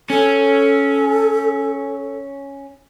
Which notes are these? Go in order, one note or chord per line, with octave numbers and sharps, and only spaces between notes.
C#4 A4